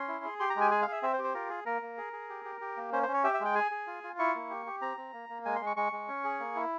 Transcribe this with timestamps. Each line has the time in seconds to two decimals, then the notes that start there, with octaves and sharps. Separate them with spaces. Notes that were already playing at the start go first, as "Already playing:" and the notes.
Already playing: C#4 C6
0.08 E4
0.24 G#4
0.40 G4 C6
0.50 A#5
0.56 G#3
0.61 G#5
0.71 G#4 G#5
0.82 F5
0.88 G#4 E5
1.03 C4 E5
1.13 C5
1.19 G4
1.24 C5
1.34 F4 A#4
1.50 G#4
1.66 A#3 A#4
1.82 A#3
1.98 G#4
2.13 G#4
2.30 G4
2.45 G4
2.61 G4
2.77 A#3
2.92 C#4 C5
3.03 C5
3.08 C#4
3.14 C#5
3.24 G4 E5
3.34 E5
3.40 G#3 G5
3.55 G#4 G#5
3.71 G#4
3.87 F4
4.03 F4
4.19 E4 C#6
4.35 A#3
4.50 G4
4.66 G4
4.81 C4 A#5
4.97 C4
5.13 A#3
5.29 A#3
5.45 G#3 G#5
5.56 C6
5.61 G#3
5.66 C#6
5.77 G#3 C#6
5.93 G#3
6.08 C#4
6.24 G#4
6.40 A#3
6.56 E4